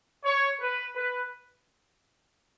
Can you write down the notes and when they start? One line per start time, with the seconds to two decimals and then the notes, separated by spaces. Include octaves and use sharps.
0.24 C#5
0.60 B4
0.96 B4